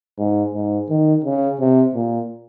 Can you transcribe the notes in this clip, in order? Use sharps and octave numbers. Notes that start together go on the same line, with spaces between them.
G#2
G#2
D#3
C#3
C3
A#2